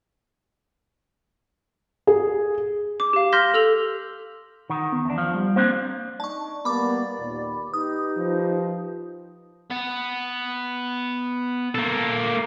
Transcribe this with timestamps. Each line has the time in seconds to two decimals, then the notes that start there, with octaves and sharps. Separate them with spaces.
2.07 G#4
3.00 D6
3.13 G4 F5
3.32 C6 F6 G6 A#6 B6
3.54 A4 E6 F7
4.70 D#3 F#5
4.92 B3
5.05 E2 D4
5.18 F3 F5
5.34 G3
5.56 A#3 C4 D4 C5
6.20 D4 D#4 D5 A5 C#6
6.65 G3 A#3 B3 D5 B5 D6
7.19 D#2 A#2
7.74 D#4 G4 B4 D#6
8.17 F3
9.70 B3
11.75 A#3 A4